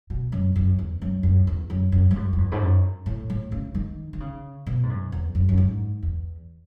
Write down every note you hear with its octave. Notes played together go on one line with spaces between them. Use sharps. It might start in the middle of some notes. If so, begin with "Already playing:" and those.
B2
F#2
F#2
E2
F#2
F#2
E2
F#2
F#2
G#2
F#2
F#2
E2
G#2
F#2
A2
A2
C#3
D#3
D#3
C#3
B2
G#2
F#2
E2
F#2
F#2
G#2
E2